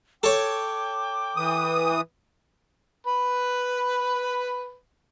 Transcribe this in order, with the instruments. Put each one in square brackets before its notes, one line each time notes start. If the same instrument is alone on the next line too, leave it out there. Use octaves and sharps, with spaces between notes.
[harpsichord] A4 C#5 [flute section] G5 D6
[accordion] E3 D#6
[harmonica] B4 B5